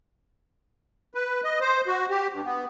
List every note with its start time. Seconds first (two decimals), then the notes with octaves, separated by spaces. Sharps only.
1.14 B4
1.44 D#5
1.61 C5
1.87 F#4
2.10 G4
2.33 G2
2.45 B3